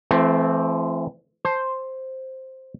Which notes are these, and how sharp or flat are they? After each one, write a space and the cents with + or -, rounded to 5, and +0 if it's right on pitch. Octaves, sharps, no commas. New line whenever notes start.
E3 +35 A3 -20 C4 +0
C5 +5 A5 +0